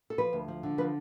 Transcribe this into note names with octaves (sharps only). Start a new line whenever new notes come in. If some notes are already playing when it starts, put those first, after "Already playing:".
A4
F3 B4
D2
F3
D3
F3 B4